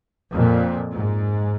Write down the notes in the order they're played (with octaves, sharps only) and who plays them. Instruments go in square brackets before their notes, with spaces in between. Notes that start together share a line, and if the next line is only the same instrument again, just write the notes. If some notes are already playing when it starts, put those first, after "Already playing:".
[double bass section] F2 A#2
G#2